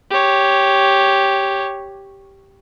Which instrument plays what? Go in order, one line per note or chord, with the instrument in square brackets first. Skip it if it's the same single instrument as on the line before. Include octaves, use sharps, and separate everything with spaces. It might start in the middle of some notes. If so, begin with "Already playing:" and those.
[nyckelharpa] G4 C#5